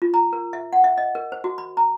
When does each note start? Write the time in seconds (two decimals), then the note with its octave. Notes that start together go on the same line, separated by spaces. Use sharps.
0.02 F4
0.14 A#5
0.33 A#4
0.53 E5
0.73 F#5
0.84 E5
0.98 D#5
1.15 A#4
1.32 C5
1.44 F#4
1.58 B5
1.77 A#5